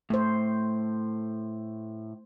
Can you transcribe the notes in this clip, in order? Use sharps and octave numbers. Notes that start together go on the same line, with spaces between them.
A2 A3 C5